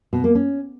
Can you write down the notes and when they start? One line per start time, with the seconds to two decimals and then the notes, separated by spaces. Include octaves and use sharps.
0.13 B2
0.24 A#3
0.35 C#4